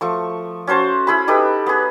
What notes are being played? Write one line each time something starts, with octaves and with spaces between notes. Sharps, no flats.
F3 A3 C#6
C#4 F#4 C5 A5
E4 G#4 B5
D#4 G4 A4 B4
B3 G#4